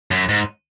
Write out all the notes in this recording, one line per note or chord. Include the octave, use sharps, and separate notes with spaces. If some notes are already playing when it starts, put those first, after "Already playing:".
F#2
G#2